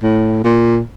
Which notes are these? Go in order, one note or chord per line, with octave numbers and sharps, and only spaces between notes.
A2
A#2